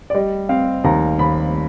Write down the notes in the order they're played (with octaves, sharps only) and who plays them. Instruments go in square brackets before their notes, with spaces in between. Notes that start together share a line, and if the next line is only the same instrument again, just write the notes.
[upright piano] D5
G3 D#5
C4 F5
D#2 A#5
D#2 B5